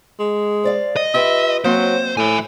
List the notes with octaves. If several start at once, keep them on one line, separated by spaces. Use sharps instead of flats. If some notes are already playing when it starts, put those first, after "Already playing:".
G#3
C5 D5 F5
D#5
F4 G4 B4 E5
F#3 A#3 C4 C5
A2 E5 G#5